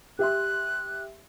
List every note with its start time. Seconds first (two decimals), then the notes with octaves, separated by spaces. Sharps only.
0.19 G4 E5 C6 F#6